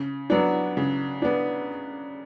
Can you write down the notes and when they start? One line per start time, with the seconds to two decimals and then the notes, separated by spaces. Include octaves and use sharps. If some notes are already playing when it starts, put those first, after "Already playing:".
Already playing: C#3
0.30 F#3 B3 D4
0.77 C#3
1.22 B3 D4